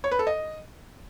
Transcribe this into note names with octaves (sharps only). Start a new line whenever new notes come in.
C#5
B4
A4
D#5